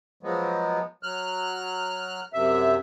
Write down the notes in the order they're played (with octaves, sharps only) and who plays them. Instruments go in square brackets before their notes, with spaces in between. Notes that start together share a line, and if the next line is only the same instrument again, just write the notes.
[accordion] F3 F#3 G#3 B3
F#3 F6 F#6
F#2 C3 E5